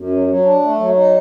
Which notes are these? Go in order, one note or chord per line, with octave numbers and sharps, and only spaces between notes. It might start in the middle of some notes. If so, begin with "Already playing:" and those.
Already playing: F#2
F#3
F#3
D4
A3
F#3
D#4